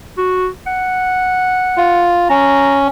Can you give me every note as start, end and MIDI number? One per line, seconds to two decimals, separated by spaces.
0.18 0.48 66
0.67 2.19 78
1.77 2.28 65
2.30 2.88 61
2.30 2.80 82